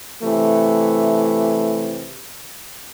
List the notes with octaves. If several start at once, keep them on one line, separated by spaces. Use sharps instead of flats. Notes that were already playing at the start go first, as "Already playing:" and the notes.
C3 E3 A3